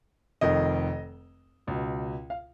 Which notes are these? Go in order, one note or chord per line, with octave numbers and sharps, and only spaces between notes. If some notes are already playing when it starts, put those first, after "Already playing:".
F1 F2 D#3 D#5
C#2 B2
F5